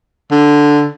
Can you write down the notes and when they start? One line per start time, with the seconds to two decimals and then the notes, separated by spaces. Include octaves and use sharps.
0.31 D3